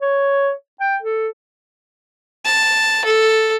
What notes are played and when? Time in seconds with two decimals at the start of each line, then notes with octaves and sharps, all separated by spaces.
0.02 C#5
0.81 G5
1.03 A4
2.45 A5
3.04 A4